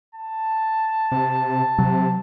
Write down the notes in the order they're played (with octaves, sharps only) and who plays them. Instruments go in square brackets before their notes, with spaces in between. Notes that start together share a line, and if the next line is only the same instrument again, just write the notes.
[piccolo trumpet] A5
[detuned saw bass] C3
[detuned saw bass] C3 [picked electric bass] F#3